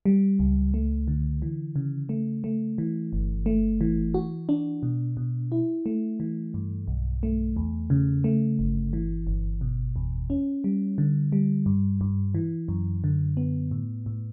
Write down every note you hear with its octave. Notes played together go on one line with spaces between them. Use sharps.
G3
C#2
A3
D3
E3
C#3
A3
A3
E3
G1
A3
E3
F#4
D4
B2
B2
E4
A3
E3
G2
B1
A3
E2
C#3
A3
G1
E3
G1
B2
E2
C#4
G3
D3
G3
G2
G2
E3
F#2
D3
B3
A2
A2